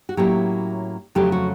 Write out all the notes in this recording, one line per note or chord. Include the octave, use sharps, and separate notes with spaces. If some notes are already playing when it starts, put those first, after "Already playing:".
F#4
A2 F#3 A#3 C#4 E4 G4
F2 C#3 F#3 A3 G4
F#4